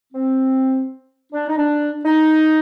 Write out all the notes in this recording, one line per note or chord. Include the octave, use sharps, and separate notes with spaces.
C4
D4
D#4
D4
D#4